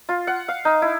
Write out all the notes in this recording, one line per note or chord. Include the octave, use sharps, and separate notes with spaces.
F4
F#5
F5
D#4
E4